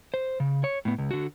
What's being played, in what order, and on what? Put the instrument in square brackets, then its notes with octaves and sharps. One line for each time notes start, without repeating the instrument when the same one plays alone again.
[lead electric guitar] C5
C#3
C#5
A2 B3
C#2
D3 F#4